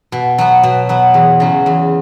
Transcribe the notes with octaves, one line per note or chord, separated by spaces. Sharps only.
B2
F#3 B3
B2
F#3 B3
E2
C#3 F#3
E2